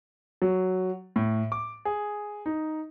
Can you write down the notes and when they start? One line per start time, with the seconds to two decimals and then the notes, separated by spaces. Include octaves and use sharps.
0.42 F#3
1.16 A2
1.52 D6
1.85 G#4
2.46 D#4